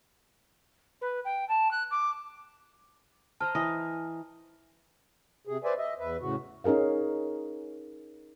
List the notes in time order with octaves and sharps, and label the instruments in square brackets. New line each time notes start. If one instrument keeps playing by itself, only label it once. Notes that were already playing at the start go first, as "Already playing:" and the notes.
[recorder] B4
G5
A5
F#6
D6
[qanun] C5 D#5 A#5 [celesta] A5 F6
[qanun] E3 [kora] D#5
[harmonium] C3 G#4
B4 C5 D5 E5 G#5
D#5 E5
E2 B4 E5
A2 C#3 F#4
[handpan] C#4 D#4 G#4 A#4 F5